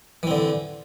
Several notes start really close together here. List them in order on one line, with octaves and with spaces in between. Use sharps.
E3 C4 D3